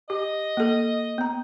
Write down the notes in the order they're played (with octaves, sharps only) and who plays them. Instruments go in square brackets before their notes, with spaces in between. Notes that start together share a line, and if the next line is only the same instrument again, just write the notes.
[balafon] G4 [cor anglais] D#5
[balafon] A#3 A4
B3 A#5